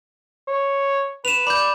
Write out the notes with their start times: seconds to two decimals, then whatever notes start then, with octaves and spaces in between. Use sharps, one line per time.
0.48 C#5
1.25 B4 E7 F7
1.47 D5 B5 G6